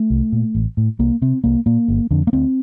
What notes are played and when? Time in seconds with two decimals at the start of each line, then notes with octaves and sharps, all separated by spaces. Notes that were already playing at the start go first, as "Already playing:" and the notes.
Already playing: A3
0.10 C2
0.32 A#2
0.55 A1
0.77 A2
0.99 C2 A#3
1.22 C3 C4
1.44 C2 A#3
1.66 A#2 A#3
1.88 G1
2.11 F2 D3
2.27 A#3
2.33 D2 C4